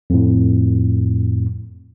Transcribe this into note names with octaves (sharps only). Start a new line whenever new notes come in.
F2 A2